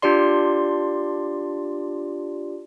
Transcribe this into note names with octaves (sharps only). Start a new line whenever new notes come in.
D4 F4 G4 D5 C6